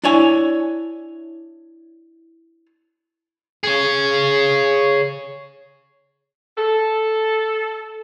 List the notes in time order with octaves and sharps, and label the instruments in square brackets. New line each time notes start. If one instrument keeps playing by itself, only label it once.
[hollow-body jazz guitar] D4 E4 C#5 G#5
[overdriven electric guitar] G#4 C#5
[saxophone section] A4